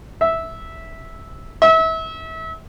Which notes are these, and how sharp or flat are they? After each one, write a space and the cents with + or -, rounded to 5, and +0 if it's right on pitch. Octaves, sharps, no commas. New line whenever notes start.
E5 -10
E5 -30